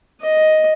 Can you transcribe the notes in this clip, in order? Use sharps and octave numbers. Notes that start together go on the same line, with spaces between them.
D#5